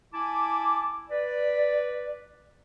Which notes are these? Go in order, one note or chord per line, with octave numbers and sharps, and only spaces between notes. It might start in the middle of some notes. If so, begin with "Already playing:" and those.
E4 G#5 A5 D6
B4 D5